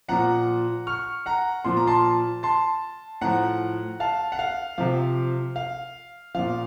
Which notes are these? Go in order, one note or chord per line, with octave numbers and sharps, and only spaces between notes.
A#2 F3 F#5 A#5
C#6 F6
F#5 A#5
A#2 F3 C6
A#5
A5 C6
A5 C6
A2 F3 F#5 A#5
F5 A5
F#5
F5
C3 F3 F5
F5
A#2 F3 F5